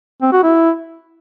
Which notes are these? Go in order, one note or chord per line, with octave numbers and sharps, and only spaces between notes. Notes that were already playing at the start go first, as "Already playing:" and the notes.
C4
F#4
E4